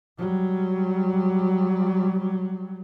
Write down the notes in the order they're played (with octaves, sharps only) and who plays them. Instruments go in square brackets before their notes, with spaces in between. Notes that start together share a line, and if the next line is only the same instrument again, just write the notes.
[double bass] F#3 G3